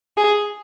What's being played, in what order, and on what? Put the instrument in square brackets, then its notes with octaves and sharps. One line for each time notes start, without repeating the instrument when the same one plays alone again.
[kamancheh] G#4